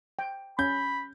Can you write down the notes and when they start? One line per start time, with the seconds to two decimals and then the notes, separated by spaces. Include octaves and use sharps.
0.19 G5
0.59 C#4 B5 G6